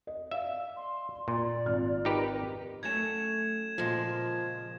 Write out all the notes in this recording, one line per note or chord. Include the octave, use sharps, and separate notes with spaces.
D#5
D5 E5 F5
C6
A#2 D5 C6
G#1 F4 F6
D#4 G4 A#4 B4
F#3 A3 C#4 G#6 E7
A#2 C#3 F3 G#3